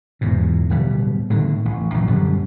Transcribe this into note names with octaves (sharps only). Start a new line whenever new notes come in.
E2 G#2 B2
D1 B2 G3
A2 D3 D#3
A1
A#1 F#2 A#2
F#2 D3 G3